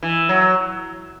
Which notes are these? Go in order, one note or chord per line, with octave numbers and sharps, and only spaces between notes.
E3
F#3